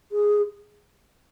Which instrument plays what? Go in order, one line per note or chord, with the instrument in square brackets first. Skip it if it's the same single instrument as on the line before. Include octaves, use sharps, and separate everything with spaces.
[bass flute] G#4